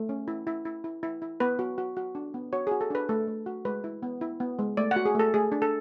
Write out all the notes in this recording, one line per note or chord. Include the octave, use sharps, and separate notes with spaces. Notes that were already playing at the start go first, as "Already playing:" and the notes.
Already playing: A3
C#4
E4
E4
E4
E4
E4
E4
B3 B4
F#4
F#4
F#4
D4
B3
F#4 C#5
F#4 G#4
A4
D4 B4
A3 A4
A3
F#4
G#3 B4
E4
B3
E4
B3
G#3
A3 D5
F#5
F#4
G#4
A3 A4
A3 G#4
D4
A4